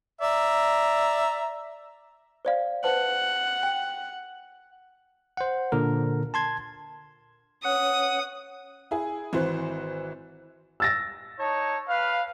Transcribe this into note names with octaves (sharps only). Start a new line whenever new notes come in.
D5 E5 A#5
C5 D5 F5
B4 C5 F#5 A5
G5
C5 F#5
A#2 D3 A#4
A5 C6 G#6
C#4 B4 C#5 F#5 D#6
E4 G#4
G#1 E3 F#4 C5
E6 A6 A#6
D#4 C#5 A5
B4 F5